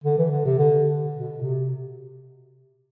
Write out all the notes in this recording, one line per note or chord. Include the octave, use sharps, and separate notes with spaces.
D3
E3
D3
C3
D3
B2
C3